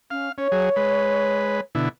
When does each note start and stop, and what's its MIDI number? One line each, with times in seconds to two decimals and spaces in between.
0.10 0.29 61
0.10 0.32 77
0.38 0.48 61
0.38 1.57 73
0.52 0.69 54
0.52 0.69 68
0.76 1.61 56
0.76 1.61 71
1.75 1.89 47
1.75 1.89 50
1.75 1.89 64